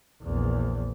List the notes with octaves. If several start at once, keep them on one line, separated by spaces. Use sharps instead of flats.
A#1 E2